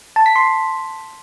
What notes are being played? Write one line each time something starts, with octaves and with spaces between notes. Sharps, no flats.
A5
B6
C6